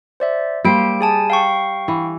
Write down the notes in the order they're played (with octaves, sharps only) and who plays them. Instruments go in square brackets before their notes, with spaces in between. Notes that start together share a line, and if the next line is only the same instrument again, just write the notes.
[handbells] C5 D5 E5
[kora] G3 G4 C5 [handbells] A#3 D7
[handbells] G#4 G#5 A5
F5 G5 C#6
[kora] E3